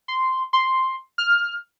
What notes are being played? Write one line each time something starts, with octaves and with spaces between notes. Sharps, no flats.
C6
C6
F6